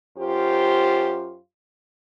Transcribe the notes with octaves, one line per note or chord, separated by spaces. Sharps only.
F#2 F4 G4 C5